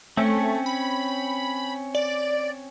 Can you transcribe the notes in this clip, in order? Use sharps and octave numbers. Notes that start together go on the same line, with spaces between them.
A3 C4 C#4 C#5
B5
D5